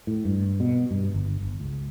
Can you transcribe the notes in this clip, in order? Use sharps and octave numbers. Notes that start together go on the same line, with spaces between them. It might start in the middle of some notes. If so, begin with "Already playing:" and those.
A2
G2
B2
G2
G1
G1
C#2